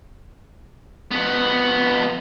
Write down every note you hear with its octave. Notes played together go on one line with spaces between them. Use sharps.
F2 B3